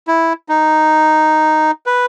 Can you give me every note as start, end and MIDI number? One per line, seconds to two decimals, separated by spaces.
0.08 0.33 64
0.49 1.71 63
1.86 2.06 71